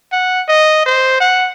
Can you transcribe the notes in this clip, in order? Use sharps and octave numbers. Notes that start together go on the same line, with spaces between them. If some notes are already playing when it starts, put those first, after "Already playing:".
F#5
D#5
C5
F#5